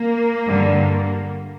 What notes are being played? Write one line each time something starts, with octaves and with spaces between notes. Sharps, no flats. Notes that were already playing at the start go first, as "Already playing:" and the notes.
Already playing: A#3
G2 D3 G3